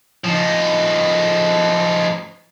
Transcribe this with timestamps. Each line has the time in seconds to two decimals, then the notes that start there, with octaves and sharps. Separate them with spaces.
0.24 F3 D#4